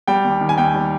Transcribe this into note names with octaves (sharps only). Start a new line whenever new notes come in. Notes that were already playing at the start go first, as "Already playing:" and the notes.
G3 G5
D#2
D#3
G#5
D#2 G5
G3